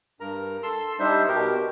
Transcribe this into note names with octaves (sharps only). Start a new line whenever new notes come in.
G2 A#4 A#5
A4 C6 E6
G3 D4 D#4 C5 E5
B2 G4 A#4